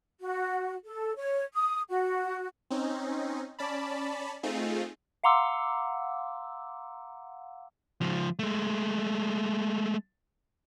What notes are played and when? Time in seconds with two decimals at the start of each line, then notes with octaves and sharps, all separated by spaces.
0.21 F#4
0.84 A4
1.16 C#5
1.53 D#6
1.88 F#4
2.70 C4 C#4 D#4
3.59 C#4 D5 A5 B5
4.43 A3 C4 D#4 F4 G#4
5.24 F5 F#5 A#5 C6 D6 E6
8.01 C#2 F3
8.39 G#3 A3